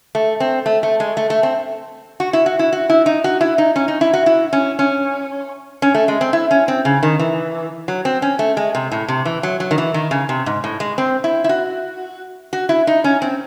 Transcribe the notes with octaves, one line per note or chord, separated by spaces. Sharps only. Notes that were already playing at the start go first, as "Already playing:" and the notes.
A3
C4
A3
A3
G#3
A3
A3
C4
F#4
E4
F#4
E4
F#4
E4
D#4
F#4
E4
D#4
C#4
D#4
E4
F#4
E4
C#4
C#4
C#4
A3
G#3
C4
E4
C#4
C4
C#3
D#3
E3
F#3
C4
C#4
A3
G#3
C3
A2
C3
E3
F#3
F#3
D#3
E3
D#3
C#3
C3
G#2
A2
G#3
C4
E4
E4
F#4
F#4
E4
D#4
C#4
C4